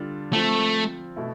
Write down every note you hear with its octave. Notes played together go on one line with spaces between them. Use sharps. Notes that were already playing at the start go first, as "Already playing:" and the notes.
Already playing: D3 G3 D4 F4
F3 A3 C4 F4
B2 A3 E4